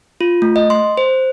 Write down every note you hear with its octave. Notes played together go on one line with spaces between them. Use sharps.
F4
A3
D#5
C6
C5